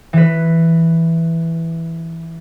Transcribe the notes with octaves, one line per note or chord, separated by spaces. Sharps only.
E3 B4